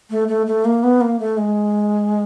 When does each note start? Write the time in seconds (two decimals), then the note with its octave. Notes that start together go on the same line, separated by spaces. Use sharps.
0.10 A3
0.28 A3
0.47 A3
0.65 A#3
0.83 B3
1.01 A#3
1.20 A3
1.37 G#3